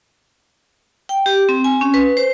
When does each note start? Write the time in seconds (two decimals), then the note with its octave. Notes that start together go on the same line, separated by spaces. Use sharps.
1.09 G5
1.26 G4
1.49 C4
1.64 G#5
1.81 C#4
1.94 B4
2.17 C5